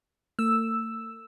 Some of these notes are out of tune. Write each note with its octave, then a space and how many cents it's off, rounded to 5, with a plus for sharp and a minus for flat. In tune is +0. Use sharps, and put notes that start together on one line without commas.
A3 +45 E6 +0